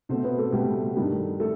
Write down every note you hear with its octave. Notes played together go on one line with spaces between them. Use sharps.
B2 A3 C4 C5
B3 B4
A3 A4
B2 G3 A3 G4
G2 D#3 G3
A3 A4